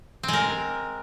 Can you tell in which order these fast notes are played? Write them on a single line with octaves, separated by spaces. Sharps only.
C4 G#3 A#4